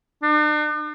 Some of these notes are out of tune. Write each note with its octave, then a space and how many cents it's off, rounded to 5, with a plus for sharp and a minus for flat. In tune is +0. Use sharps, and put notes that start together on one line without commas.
D4 +45